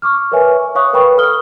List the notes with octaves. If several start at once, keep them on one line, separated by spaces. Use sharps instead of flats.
C#6 D6 F6
A#4 B4 C#5 E5 G#5
C#6
C#5 F5 C#6 D#6 F#6
A#4 B4 G5 B5 C#6
A4 D#6 F6 G7